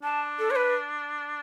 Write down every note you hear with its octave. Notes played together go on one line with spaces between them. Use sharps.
D4 A5
A4
C#5
B4